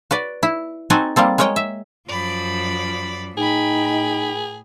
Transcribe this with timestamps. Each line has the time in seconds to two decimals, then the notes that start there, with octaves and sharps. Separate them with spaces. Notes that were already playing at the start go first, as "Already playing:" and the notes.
0.11 F#4 B4 D5
0.43 E4
0.90 C4 D#4 F#4 A4 D#5 G#5
1.16 G3 A#3 C4 A4
1.38 G#3 A#4 C#5 D#5 G5
1.56 E5
2.08 F#2 F3 D5 B5
3.37 A2 D#4 G#4 G5 B5